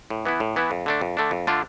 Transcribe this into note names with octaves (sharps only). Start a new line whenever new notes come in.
A2
E3 B3 E4
A2
E3 B3 E4
F2
D3 A3 D4
F2
D3 A3 D4
F2
D3 A3 D4 F4